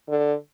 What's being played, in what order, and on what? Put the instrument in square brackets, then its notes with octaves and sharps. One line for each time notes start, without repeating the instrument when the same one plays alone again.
[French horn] D3